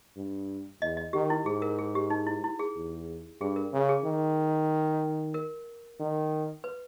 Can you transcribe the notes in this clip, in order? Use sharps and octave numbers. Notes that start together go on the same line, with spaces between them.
G2
E2 D#5
D#5
D#3 G4
E4
G#2 G#4
A#4
G#4
G4
D#4
E4
E4
G#4
E2
G2 G#4
A#4
C#3
G#4
D#3
A#4
D#3
B4